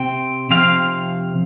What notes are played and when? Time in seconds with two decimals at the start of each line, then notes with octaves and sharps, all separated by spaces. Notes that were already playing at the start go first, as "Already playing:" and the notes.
Already playing: C3 C4 G5
0.51 C3 F3 C4 F5